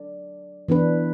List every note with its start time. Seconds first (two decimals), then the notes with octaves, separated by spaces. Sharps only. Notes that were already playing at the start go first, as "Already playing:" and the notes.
Already playing: F#3 D4 A4 D5
0.68 E3 B3 D4 B4